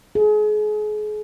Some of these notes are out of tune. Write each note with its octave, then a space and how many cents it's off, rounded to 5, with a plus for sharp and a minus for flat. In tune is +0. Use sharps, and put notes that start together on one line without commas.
G#4 +35